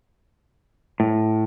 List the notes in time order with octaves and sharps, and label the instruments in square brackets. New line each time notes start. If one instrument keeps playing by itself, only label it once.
[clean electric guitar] A2